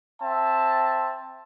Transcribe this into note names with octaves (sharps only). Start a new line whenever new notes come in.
C4 E5 A5